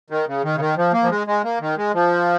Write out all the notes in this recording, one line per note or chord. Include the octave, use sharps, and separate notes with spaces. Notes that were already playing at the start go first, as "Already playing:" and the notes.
D#3
C#3
D#3
C#3
D#3
F3
A#3
F3
G#3
G#3
A#3
D#3
G#3
F3